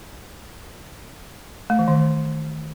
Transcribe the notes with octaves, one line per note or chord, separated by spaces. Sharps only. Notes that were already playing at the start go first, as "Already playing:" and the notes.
A3
E3
D#3